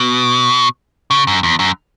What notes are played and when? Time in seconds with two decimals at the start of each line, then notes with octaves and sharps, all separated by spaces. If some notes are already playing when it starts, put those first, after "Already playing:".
Already playing: B2
1.11 C#3
1.27 F#2
1.43 E2
1.59 F#2